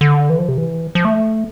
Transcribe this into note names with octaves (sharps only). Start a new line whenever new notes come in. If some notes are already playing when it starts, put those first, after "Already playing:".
D3
E3
F3
C3
E3
F3
A3